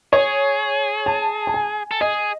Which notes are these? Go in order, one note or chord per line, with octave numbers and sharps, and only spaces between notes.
G#4 C#5
A5
A5
G#5
A4
G#4 D#5